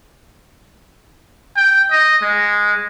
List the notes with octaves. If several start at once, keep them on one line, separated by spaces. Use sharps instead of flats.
G5
D#5
G#3